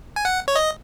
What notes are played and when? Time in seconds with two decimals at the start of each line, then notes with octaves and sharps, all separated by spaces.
0.16 G#5
0.25 F#5
0.48 C#5
0.56 D#5